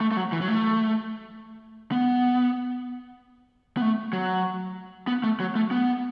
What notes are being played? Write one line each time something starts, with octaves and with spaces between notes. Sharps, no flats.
A3
A3
F#3
E3
F#3
A3
B3
B3
A3
F#3
B3
A3
F#3
A3
B3